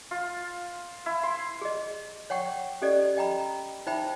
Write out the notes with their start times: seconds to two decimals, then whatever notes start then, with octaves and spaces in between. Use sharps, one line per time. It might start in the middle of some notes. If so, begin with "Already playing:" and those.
0.11 F4
1.06 E4
1.23 C6
1.61 G#4 D#5
2.30 C#5 F#5 G5 C#6
2.82 C#4 G4 A4 D5 D#5
3.17 D#5 G5 A#5 B5
3.87 D#4 C5 E5 G5 B5